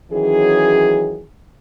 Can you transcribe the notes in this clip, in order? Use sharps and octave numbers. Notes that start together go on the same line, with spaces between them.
D#3 E3 F#3 C#4 G#4